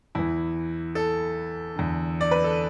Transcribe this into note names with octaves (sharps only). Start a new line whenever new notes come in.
E2 E3 E4
A4
E2 D3
D5
B4
A4